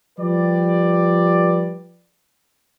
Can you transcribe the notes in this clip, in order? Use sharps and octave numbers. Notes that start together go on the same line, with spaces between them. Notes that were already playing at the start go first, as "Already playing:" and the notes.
F3 G3 G4 B4 D5